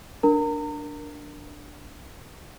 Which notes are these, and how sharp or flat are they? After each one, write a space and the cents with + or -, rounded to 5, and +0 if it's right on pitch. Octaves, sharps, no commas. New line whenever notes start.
D4 +5 A#4 +0 A#5 -35